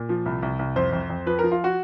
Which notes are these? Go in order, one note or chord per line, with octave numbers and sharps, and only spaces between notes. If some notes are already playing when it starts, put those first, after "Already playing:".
Already playing: A#2
F3
C2
C2
C2
F2 C5
F2
F2
F3 B4
F3 A#4
F4
F#4